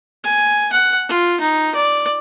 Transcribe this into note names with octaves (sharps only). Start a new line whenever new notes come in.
G#5
F#5
F4
D#4
D5